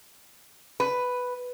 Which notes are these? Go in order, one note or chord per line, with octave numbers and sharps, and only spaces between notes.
B4